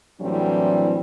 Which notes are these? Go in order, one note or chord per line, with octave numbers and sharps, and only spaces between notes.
A2 E3 F#3 G3 C4 D4